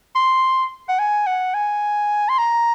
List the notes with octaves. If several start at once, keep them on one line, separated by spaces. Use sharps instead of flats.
C6
F#5
G#5
F#5
G#5
C6
A#5